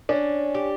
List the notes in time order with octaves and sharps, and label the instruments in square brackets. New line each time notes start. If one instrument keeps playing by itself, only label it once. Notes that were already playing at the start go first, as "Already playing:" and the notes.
[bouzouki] C#4 [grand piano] D4
[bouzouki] G4